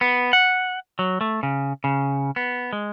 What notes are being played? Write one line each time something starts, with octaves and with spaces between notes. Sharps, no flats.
B3
F#5
F#3
A3
C#3
C#3
B3
G#3